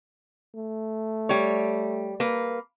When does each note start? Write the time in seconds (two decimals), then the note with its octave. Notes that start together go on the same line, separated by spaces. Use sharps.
0.55 A3
1.29 G3 C#5
2.20 A#3 B4